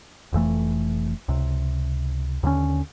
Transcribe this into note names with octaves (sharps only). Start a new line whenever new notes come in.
F1 F2 E3 A3
C#2 C3
D#2 D3 E3 C#4